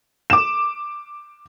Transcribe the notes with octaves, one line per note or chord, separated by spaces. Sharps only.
D6 E7